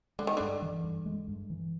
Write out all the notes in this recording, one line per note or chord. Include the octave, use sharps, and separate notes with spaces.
D3 G#3
D#3
G2 D3
E3
G2
G#3
G2
E3